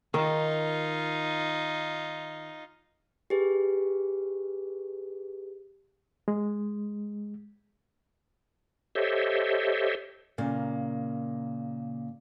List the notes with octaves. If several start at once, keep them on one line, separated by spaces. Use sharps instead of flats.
D#3 D#4 F4
G4 G#4 B4
G#3
G4 A4 C5 C#5 D#5 E5
A#2 C#3 A#3